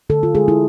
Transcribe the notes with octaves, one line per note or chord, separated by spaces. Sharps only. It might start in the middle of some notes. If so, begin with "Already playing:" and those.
D3 A4
F4
G#3 G#4
E4